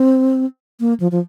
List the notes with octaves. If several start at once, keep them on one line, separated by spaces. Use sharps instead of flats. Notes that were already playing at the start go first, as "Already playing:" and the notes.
Already playing: C4
A#3
F3
F3